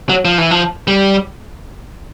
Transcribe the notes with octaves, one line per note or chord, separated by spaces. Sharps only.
F#3
F3
E3
F3
G3